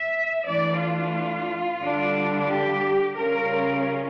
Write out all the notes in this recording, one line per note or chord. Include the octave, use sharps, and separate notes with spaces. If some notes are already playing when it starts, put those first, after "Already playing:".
Already playing: E5
E3 A3 D4 D5
F4
D3 G3 D4
G4
C#3 G3 C#4 F4 A#4